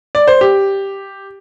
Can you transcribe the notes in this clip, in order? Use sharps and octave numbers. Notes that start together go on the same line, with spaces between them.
D5
C5
G4